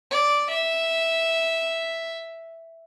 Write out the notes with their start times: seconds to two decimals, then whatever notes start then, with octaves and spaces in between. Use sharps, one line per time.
0.11 D5
0.50 E5